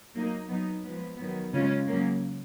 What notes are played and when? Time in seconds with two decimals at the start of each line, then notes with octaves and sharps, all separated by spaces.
0.14 F#3 A#3 D#4
0.49 F#3 B3 D#4
0.84 F3 G#3 B3
1.19 D#3 F#3 B3
1.53 C#3 G#3 C#4 F4
1.88 C#3 F#3 A#3 C#4